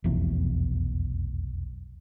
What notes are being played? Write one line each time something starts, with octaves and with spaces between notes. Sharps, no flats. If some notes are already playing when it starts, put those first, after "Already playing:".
F1 B1 E2